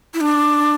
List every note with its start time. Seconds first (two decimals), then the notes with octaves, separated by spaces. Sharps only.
0.14 E4
0.21 D4